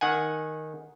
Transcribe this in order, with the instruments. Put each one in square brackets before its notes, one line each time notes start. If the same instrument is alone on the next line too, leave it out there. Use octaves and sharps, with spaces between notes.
[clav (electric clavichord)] D#3 F#5 G#5